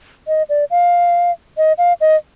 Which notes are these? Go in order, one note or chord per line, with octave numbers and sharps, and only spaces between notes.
D#5
D5
F5
D#5
F5
D#5